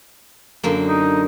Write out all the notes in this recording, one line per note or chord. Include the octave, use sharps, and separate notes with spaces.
F#2 D3 A#3
D#4